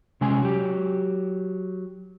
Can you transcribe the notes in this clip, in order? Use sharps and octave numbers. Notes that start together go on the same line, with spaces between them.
C3 G#3 C#4 G#5
F#3 G4